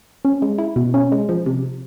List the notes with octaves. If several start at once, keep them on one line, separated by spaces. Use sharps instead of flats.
C#4
G#3
E4
B2
C#4
G#3
F3
C3